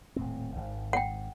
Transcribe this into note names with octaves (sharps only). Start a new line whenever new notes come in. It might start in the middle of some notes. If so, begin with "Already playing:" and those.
D#1 A2 C4
G#1 G#2
F#5 G5